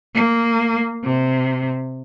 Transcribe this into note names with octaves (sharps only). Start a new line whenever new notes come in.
A#3
C3